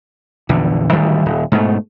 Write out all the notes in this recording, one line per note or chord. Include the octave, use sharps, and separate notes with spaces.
A#1 E2 D3
D1 D2 D#3 G3
D#1
G#2 B2 A3